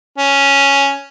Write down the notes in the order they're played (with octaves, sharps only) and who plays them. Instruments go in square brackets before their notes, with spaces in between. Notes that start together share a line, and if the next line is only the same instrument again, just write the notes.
[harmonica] C#4